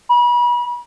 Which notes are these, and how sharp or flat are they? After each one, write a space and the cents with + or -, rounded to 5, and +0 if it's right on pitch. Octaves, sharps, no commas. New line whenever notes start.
B5 -35